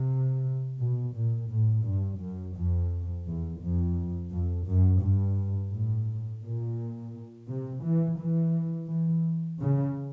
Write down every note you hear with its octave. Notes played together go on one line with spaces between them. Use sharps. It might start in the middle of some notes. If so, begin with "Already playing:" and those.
Already playing: C3
B2
A#2
A2
G2
F#2
F2
E2
F2
F2
F#2
G2
A2
A#2
C3
E3
E3
E3
C#3